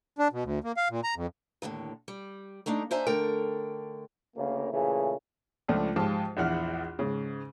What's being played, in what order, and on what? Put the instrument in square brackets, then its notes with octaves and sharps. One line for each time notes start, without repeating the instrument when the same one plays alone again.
[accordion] D4
B2
D2
A#3
F5
A#2
A#5
F2
[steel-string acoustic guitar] D#2 A2 D3 D#3
G3
A3 A#3 D4 D#4
D4 D#4 C5 E5 G#5 A5
D3 A3 A#4 G5
[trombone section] D2 C#3 A#3
A#2 C#3 E3 A3 G#4
[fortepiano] C#2 F3 A3 D4
G#2 F3 F4 G4 G5 A5
A#1 E2 F#5 F6
G#2 C#3